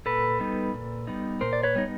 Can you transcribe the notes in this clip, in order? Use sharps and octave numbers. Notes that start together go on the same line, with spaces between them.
A#2 A4 B4
G3 B3 D#4
A#2
G3 B3 D#4
A#2 A#4 C5
D5
B4 C#5
G3 B3 D#4